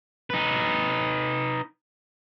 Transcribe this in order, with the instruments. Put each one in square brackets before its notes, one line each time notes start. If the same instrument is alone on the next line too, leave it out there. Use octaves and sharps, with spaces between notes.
[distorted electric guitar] D#4 B4